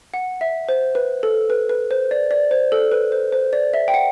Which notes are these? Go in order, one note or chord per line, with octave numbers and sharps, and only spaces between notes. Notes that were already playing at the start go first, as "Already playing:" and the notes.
F#5
E5
C5
B4
A4
B4
B4
C5
D5
D5
C5
A4
B4
C5
C5
D5
E5
G5
F#5